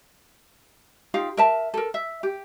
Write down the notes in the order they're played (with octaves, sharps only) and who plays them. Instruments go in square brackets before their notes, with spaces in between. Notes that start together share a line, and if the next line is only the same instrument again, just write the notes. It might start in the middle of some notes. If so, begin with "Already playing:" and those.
[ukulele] D#4 F4 G4 F5
A#4 E5 A5
A4 A#4
E5
G4